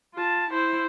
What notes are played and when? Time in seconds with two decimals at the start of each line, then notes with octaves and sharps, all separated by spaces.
0.14 F4 A5
0.50 E4 C5